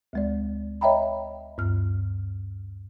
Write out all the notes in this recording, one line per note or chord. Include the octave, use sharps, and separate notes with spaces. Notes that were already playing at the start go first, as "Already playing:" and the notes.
D2 G#3 D5
C#5 D#5 E5 G5 A#5 B5
D2 G2 F6